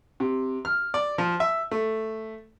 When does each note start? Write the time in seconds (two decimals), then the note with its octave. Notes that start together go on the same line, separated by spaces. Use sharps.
0.20 C3
0.65 F6
0.94 D5
1.18 F3
1.40 E5
1.71 A3